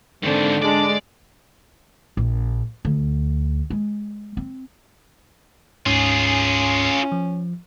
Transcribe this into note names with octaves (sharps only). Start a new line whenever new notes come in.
G#2 D3 D#3 C4
G#3 D4 D5
A#1
D2
G#3
C4
D2 G#2 C#4 F4 G#4
F3